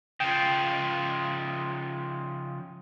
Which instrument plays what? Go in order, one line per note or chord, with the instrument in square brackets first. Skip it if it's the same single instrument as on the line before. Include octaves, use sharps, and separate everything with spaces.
[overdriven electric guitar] C#3 F3 [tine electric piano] G5